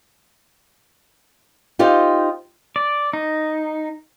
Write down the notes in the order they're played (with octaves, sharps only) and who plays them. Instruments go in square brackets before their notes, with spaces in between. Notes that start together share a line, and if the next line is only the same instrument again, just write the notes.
[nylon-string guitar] D#4 F4 G4 C5
[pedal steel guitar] D5
D#4